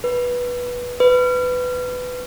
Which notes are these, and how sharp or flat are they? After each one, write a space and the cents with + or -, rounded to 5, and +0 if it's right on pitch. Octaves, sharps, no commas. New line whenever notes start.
B4 -15
B4 +15